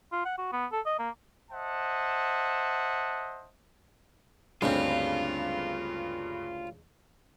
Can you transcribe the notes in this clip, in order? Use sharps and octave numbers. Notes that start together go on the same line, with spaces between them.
F4
F#5
F#4
B3
A4
D#5
A#3
C5 D#5 E5 F#5 A5
D2 G2 C#3 G3 G#3 C4 F4